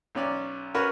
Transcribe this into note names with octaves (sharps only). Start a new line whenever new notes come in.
B1 C#4 D5
C#4 F#4 A#4 B4 C#5